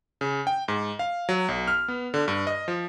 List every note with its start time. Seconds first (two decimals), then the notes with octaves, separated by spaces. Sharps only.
0.21 C#3
0.47 G5
0.68 G#2
0.99 F5
1.29 F#3
1.48 B1
1.67 F6
1.88 B3
2.14 D3
2.28 G2
2.47 D#5
2.68 F3